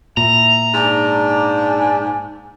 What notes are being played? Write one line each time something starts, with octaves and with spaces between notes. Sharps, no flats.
A#2 E4 A#5
G#2 D4